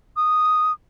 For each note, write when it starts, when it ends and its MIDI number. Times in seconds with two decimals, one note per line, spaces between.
0.17 0.72 87